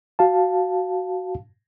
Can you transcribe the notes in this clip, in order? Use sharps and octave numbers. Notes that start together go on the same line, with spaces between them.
F#4 F5 A5